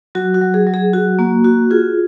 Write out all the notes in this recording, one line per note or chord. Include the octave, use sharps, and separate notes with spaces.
F#3 F#4
F#4
F#3
G#4
F#3
G#4
F#4
A#3 F#4
F#4
F4 G#4